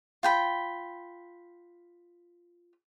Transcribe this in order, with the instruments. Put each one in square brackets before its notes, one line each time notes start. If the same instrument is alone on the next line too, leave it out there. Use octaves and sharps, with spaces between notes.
[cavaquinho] F4 G5 B5